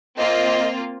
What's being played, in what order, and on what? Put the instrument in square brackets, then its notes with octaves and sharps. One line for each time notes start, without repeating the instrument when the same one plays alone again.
[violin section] A#3 C4 F4 [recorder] D#5